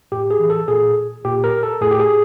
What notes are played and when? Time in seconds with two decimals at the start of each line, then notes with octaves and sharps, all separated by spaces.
0.12 A2 G4
0.31 G#4
0.40 E3
0.50 A4
0.68 A#2 G#4
1.25 A#2 G4
1.44 A#4
1.63 A4
1.81 A2 G#4
1.91 G4
2.00 G#4